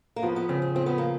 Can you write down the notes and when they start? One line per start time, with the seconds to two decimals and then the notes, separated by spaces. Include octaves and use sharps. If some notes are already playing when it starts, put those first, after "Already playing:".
0.16 A#3
0.23 F3 B3
0.36 B3
0.49 C#3 C4
0.62 C4
0.75 F3 C4
0.86 B3
0.98 A#3